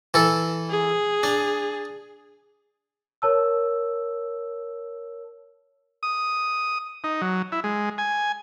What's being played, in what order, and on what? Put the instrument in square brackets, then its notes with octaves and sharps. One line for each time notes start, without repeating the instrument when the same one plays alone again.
[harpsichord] E3 A4
[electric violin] G#4
[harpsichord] D4
[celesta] A#4 C#5 A5 E6
[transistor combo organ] D#6
D#4
F#3
E4
G#3
G#5